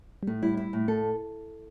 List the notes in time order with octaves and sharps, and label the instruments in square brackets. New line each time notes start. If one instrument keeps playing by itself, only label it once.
[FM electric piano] G3
[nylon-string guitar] A2 [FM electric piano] A3
[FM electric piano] G3 [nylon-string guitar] E4
[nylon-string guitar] E4
A2
[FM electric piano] A3 [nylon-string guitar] A4